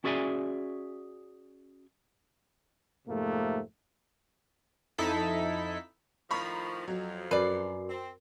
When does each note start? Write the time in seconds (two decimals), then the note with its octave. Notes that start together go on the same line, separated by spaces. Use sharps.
0.04 C#4 F#4 G#4 D5 E5 G#5
3.08 F2 G#2 C3 A3 A#3
4.98 F2 D#4 E4 A4 B6
6.31 A2 D#3 F3 A#5 B5 C#6
6.88 F2 F#3
7.31 F#2 B4 D5 C7
7.90 C4